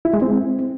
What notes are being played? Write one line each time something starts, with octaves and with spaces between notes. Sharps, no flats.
E4
G#3
C4